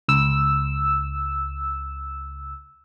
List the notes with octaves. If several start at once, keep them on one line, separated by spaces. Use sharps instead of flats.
C#2 E6